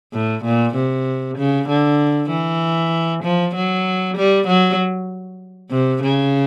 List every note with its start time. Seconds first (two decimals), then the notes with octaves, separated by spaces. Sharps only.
0.13 A2
0.44 A#2
0.75 C3
1.37 C#3
1.68 D3
2.30 E3
3.23 F3
3.55 F#3
4.17 G3
4.47 F#3
5.71 C3
6.03 C#3